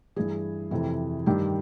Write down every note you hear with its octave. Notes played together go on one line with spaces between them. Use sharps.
G2 E3 G#4
F2 C3 E3
G2 D#3 G4